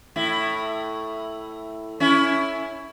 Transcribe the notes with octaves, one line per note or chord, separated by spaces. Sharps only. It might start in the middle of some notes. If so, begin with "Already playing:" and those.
A2 E4
C#4 E4